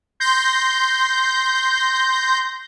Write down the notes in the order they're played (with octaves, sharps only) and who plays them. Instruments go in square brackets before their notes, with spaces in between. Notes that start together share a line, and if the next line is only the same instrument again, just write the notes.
[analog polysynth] C6 G6 A#6